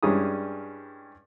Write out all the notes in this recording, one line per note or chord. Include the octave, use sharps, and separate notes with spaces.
G2 G3 G#3 C#4 E4 D#6